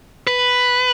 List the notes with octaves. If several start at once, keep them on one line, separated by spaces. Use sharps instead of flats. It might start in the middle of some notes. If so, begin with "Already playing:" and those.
B4